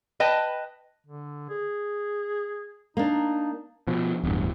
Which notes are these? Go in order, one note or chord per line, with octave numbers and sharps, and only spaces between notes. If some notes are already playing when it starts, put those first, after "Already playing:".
B4 D#5 G5 A5
D3
G#4
A#3 D4 D#4
B2 F3
D1 E2 G2